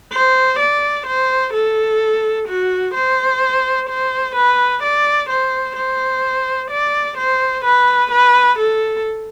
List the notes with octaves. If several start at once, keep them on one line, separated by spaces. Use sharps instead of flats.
C5
D5
C5
A4
F#4
C5
C5
B4
D5
C5
C5
D5
C5
B4
B4
A4